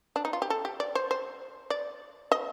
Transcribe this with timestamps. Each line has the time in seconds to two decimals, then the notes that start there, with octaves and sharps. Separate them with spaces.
0.16 D4
0.25 D#4
0.33 F4
0.42 G4
0.50 A4
0.65 G4
0.80 D5
0.95 C5
1.11 C5
1.70 D5
2.32 D#5